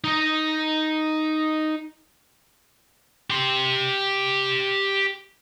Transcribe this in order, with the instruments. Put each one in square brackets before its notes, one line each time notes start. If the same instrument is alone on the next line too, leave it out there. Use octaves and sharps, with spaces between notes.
[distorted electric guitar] D#4 D#5
G4 C6